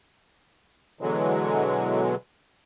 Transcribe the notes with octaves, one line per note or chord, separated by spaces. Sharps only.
B2 D3 E3 F#3 G#3